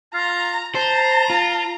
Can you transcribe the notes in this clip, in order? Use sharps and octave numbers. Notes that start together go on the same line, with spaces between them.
F4 A#5
C5 A5 A#5
F4